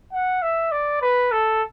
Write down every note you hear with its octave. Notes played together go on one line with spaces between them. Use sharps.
F#5
E5
D5
B4
A4